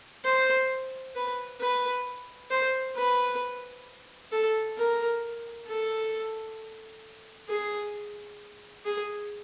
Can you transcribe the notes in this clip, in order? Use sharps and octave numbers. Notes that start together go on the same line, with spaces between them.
C5
B4
B4
C5
B4
A4
A#4
A4
G#4
G#4